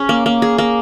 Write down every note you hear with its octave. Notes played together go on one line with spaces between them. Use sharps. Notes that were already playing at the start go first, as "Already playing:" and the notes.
Already playing: C#4 G#4
A#3
A#3
G#4
A#3